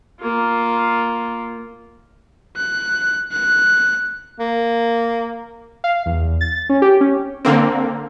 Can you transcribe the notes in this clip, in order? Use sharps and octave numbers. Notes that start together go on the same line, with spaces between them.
A#3 F4
F#6
F#6
A#3
F5
E2
A6
C#4
G4
C#4
D3 A#3 C4